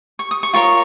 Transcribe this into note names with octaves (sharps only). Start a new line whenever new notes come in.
C#6
D#6
C#6
F4 A#4 C#5 C#6